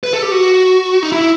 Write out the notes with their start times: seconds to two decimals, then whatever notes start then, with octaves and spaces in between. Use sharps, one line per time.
0.03 B4
0.13 A4
0.22 G4
0.32 F#4
1.03 D#4
1.12 E4